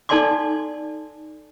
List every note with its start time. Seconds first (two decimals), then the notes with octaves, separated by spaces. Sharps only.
0.09 D#4 A4 D5 G#5 C6 D6